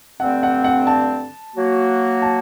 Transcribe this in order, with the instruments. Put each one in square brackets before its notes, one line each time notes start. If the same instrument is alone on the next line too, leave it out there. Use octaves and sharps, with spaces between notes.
[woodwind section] G2 D3 A3 C4 [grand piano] F#5
[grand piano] F#5
F#5
A5
[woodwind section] F#3 A#3 F#4
[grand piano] A5